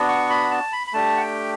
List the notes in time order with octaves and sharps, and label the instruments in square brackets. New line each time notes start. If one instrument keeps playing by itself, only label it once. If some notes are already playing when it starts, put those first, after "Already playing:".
Already playing: [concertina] B3 D4 F#4
C#6
B5
A5
B5
B5
A3 D4 G4 A5
F#5
G5